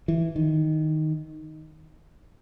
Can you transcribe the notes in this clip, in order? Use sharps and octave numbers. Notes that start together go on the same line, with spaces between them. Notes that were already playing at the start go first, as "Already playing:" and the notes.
E3
D#3